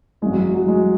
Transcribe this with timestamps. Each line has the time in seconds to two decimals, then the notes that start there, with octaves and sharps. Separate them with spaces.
0.22 G#1 F#2 E3 G#3
0.32 F#3
0.54 F#3
0.68 G#3